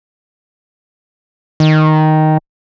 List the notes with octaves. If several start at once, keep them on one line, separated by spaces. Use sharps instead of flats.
D#3